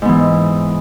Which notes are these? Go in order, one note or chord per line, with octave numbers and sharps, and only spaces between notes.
G#2 E3 B3